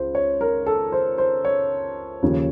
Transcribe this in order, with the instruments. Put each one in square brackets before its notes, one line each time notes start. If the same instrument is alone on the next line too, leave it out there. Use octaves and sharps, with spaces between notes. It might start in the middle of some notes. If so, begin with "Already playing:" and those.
Already playing: [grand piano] C#2 C5
C#5
A#4
A4
C5
C5
C#5
D#2 C#3 F3